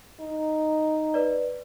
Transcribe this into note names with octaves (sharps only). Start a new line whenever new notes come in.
D#4
B4 D5